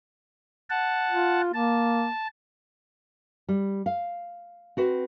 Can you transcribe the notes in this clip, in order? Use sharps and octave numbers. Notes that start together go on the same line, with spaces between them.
F#5 A5
F4
A#3 A5
G3
F5
C4 F#4 B4